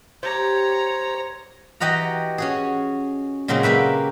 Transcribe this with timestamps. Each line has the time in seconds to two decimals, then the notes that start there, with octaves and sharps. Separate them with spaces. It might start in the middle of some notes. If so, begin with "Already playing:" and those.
0.23 G4 C5 C#5 A#5
1.80 E3 F#4 G4 D#5 F#5 A#5
2.38 C#4 F#4 G#4
3.48 A#2 C#3 F#3 G#3 C4 C#4
3.63 A#3 G4 B4 E5